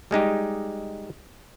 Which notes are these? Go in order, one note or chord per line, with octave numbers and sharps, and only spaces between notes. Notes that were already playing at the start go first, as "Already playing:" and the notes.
G3 G#3 D#4 G4